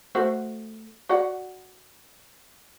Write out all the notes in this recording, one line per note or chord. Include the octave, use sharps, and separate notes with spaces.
A3 F#4 C5
F#4 D5 F#5